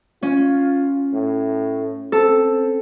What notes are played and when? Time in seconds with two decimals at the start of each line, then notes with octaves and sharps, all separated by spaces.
0.23 C#4 F4
1.13 A2
2.12 C4 A4